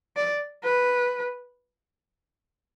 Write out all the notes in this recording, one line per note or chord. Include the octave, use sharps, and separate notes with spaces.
D5
B4